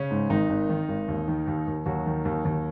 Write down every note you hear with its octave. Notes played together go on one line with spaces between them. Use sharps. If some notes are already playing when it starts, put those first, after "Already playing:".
Already playing: C#3 C#4
G#2
G#1 D#3 D#4
G#1
D#3
G#1
D#2
D#3
D#2
D#2
D#2 F#3 F#4
D#3
D#2
D#2